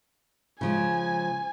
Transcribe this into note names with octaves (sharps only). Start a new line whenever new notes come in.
C#3 F3 G#3 G#5